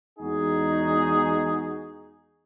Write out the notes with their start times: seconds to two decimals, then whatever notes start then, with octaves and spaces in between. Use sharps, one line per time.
0.19 E2 G#3 D#4 F#4 G#4